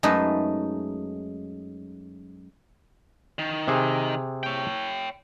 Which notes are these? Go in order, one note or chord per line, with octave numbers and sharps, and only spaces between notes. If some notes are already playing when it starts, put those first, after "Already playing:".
F#2 G#3 A3 D#4 B4 E5
D#3
C3 G#4
C#5 G5